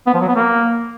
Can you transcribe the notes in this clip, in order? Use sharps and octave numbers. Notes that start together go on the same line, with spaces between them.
B3
F3
F#3
B3
A#3